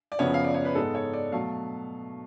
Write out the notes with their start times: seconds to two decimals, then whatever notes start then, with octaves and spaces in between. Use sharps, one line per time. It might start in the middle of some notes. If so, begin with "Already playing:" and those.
0.12 D5
0.19 F#2 C#3 F3 B3 C#5
0.34 F5
0.44 D5
0.54 C#5
0.65 B4
0.75 G#2 G#3 B3 A4
0.95 C#5
1.13 D5
1.32 B2 F#3 A3 F5